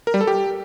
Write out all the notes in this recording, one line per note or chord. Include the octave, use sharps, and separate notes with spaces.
A#4
G3
A4
G4